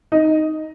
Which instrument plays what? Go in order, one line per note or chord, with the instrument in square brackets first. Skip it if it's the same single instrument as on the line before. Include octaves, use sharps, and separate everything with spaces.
[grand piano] D#4